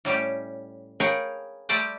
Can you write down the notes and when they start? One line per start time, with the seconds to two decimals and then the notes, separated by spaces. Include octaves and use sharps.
0.05 A2 G3 C#4 G4
1.00 G#4 A#4 B4 C#5 F5 G5
1.69 G3 A3 G4 C5 D5 G5